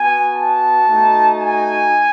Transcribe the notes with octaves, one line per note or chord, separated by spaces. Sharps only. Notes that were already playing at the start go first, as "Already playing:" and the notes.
Already playing: B3 F#4 G#5
A5
A3 D#4 F#4
G#5